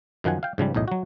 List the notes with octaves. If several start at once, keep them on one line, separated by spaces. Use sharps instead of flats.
F#2 D#3 F3 F#5 G#5
F5 G5
G#2 C#3 F3 G3
B1 E2 A2 D#5
F#3 F#4